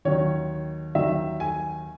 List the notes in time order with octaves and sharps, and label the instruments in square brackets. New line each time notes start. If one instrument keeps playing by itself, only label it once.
[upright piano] D#2 D#3 F#3 C#5
D#2 D#3 F#3 E5
G#5